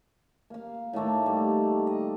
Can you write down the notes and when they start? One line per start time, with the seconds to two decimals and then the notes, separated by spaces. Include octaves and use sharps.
0.50 A#3 F5
0.93 A2 D#3 A3 A#3
1.26 G3
1.87 D#5